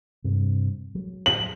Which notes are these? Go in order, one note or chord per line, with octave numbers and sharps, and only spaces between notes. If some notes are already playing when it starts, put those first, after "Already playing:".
G2 C3
F#3
F#7